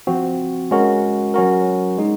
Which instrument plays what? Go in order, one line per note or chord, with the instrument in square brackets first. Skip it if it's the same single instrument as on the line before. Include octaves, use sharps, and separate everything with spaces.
[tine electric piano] F3 C4 F#4
G#3 C#4 F#4 A#4
F#3 C#4 F#4 A#4
G#3 D#4